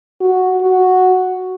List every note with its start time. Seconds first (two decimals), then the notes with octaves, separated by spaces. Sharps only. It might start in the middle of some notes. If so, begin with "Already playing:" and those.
0.21 F#4
0.61 F#4